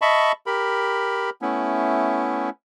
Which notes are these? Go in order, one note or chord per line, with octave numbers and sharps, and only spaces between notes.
D#5 E5 A5 B5 C#6
G4 A#4 B5
A3 B3 C#4 E4